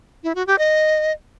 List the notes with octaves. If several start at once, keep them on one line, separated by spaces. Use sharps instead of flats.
E4
F#4
G4
D#5